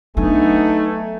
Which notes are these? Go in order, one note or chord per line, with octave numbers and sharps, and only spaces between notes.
F#3 A3 B3 D4 D#4 G#5